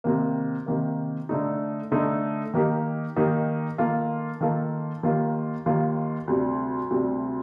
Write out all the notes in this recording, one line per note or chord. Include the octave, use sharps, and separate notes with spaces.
C3 D#3 A#3
C3 D#3 A#3
D3 A3 D#4
D3 A3 D#4
D#3 A#3 D#4 G4
D#3 A#3 D#4 G4
D#3 A#3 F4 A4
D#3 A#3 F4 A4
D#2 D#3 A#3 F4
D#2 D#3 A#3 F4
D2 C3 G3
D2 C3 G3